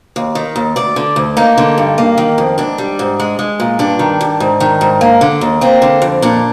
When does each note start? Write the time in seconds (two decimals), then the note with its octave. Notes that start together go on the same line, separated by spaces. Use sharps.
0.16 D#2
0.35 D#3
0.56 D#2
0.76 D2 D5
0.96 D3
1.16 D2
1.37 A#3 D#4
1.58 D3
1.78 G2
1.98 A#3
2.18 D#3
2.38 F2
2.58 G#2 D4
2.78 G3
2.99 G#2
3.20 G#3
3.39 G#3
3.60 A#2
3.79 G2 D4
3.99 D#3
4.21 G2
4.40 G#2
4.60 D#3
4.81 G#2
5.01 A#3
5.21 D3
5.41 D#2
5.61 A#3 C4
5.82 D3
6.02 F2
6.22 A#2 D4